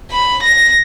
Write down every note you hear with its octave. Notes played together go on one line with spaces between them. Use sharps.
B5
A#6